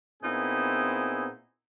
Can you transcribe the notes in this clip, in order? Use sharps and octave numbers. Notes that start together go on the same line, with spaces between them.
A#2 B3 C4 D#4 E4 G#4